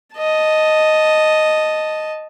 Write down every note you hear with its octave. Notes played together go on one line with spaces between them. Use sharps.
D#5 A5